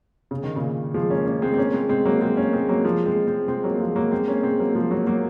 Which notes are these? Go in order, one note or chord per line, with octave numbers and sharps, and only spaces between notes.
C#3
D#3
A#2 C#3
F3 G#3
A#3 C#4
A#3 C#4
G#3 C4
C4
A#3 C#4
G#3 C4
G#3 C4
F#3 A#3
G#3 C4
A#3 C#4
G#3 C4
F#3 A#3
F3 G#3
G#3 C4
G#3 C4
G#3 C4
F#3 A#3
F3 G#3
F#3 A#3
G#3 C4
A#3 C#4
G#3 C4
F#3 A#3
F3 G#3
F#3 A#3
F#3 A#3